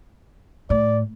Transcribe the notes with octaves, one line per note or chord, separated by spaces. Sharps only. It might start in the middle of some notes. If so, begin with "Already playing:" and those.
A2 D5